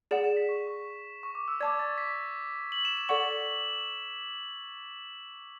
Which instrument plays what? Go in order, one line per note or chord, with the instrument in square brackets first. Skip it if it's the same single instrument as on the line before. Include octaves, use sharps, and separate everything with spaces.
[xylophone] G#4 D5 F#5 [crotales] E7
[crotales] E7
B6
C#6
C#6
C#6
D6
E6
[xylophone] D5 A5 D6 [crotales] G#6
[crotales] A6
B6
F#7
E7
E7
[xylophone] A4 D5 F#5 C#6 [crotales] F#7